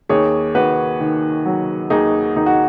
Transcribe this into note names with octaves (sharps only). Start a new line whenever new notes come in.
D#2 G#4 C#5
D#2 F#4 B4
D#3
F#3
D#2 D#4 G#4
D#2 D#4
F#4